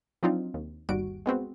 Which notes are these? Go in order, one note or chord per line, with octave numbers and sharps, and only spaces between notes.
F3 F#3 C4 D4 D#4 F4
D#2
G1 D#2 G3 F#4 D7
G#3 B3 C4 F#4